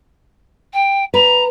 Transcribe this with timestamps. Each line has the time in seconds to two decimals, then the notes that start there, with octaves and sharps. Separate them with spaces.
0.74 G5
1.14 B4 A#5